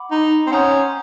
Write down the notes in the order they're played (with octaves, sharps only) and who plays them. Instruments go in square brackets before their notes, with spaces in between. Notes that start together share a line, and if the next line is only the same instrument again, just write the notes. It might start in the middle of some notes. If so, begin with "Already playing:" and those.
Already playing: [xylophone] F#5 B5 D6
[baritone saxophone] D#4
C4
[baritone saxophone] C#4 [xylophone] F#5 A#5 D#6 G6